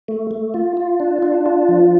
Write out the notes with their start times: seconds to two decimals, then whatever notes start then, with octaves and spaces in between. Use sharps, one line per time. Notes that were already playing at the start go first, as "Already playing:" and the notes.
0.08 A3
0.31 A3
0.54 F4
0.77 F4
1.00 D4
1.23 D4
1.46 F4
1.69 F3